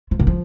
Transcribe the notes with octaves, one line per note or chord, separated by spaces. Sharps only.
F3
D#3
F3